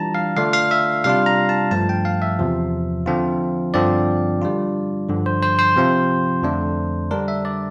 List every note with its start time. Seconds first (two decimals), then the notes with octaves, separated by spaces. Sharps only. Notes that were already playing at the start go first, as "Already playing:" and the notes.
Already playing: E3 G3 D4 F4 A5 A#5
0.15 F5
0.37 D3 A3 D4 F4 F5
0.53 F5
0.71 E5
1.04 C3 G3 D4 F4 F5
1.26 A#5
1.49 A5
1.71 G2 F3 A3 A5
1.89 G5
2.05 F5
2.22 E5
2.39 E2 C3 F3
3.06 D3 F3 C4 F4
3.74 G2 D3 F3 C4 D5
4.42 D3 G3 D4 F4
5.09 G2 D3 F3
5.26 C5
5.43 C5
5.59 C5
5.76 C3 F3 C4 F4
6.43 F2 D3 A3 D4
7.11 D3 G3 D4 A#4
7.28 E5
7.45 D5